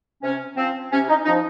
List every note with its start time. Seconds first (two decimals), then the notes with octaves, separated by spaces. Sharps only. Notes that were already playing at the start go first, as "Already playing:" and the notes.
0.23 C3 C#4
0.57 F3 C4
0.92 C3 C#4
1.09 D#4
1.25 F3 D#4